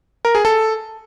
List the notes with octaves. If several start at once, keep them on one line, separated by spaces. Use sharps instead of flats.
A#4
G#4
A4